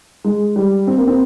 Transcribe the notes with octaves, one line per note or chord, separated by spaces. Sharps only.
G#3
G3
C4
A#3
C4